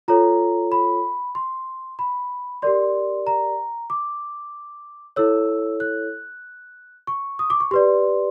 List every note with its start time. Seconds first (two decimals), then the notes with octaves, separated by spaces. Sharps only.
0.08 F4 A4 C#5 A#5
0.72 B5
1.35 C6
1.99 B5
2.62 G4 A#4 D5 C6
3.27 A#5
3.90 D6
5.16 E4 A4 C#5 E6
5.80 F#6
7.07 C#6
7.39 D#6
7.50 D6
7.60 C#6
7.71 G4 B4 D5 C6